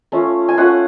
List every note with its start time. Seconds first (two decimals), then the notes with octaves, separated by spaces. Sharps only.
0.12 A3 C#4 F4
0.48 G#5
0.57 A3 C#4 F4 F#5